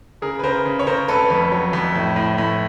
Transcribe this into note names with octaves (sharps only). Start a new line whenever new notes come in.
C#3 G#4 A#4
B4
C#3 A#4 C5
C#3
C#5
C#3 A#4 C5
F1 A4 B4
F2
F#3
F2
A2
A2
A2